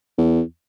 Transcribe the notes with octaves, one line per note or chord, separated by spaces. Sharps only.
E2